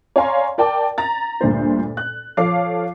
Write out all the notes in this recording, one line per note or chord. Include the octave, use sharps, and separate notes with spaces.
C#5 D5 F5 G#5 A#5 C6
A#4 D5 G5 A5 D6
A#5 A6
D2 G2 A#2 C5
F#6
F3 A4 C#5 F5 D6 C7